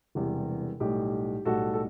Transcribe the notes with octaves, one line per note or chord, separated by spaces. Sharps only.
E1 E2 C3 E3 G3
B1 A2 G3 G4
B1 A2 G3 F#4 A4
A4